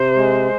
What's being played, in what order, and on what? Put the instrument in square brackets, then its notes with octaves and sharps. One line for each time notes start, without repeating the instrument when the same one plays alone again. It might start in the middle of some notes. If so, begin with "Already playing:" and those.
Already playing: [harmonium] C3 [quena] C5
[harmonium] G#3